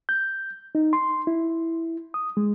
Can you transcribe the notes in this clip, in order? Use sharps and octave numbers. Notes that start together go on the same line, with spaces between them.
G6
D#4
C6
E4
D#6
G#3